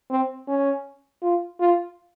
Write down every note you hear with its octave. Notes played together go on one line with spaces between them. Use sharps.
C4
C#4
F4
F4